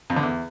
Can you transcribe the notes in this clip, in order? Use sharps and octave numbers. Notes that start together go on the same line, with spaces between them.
F2
D3
E2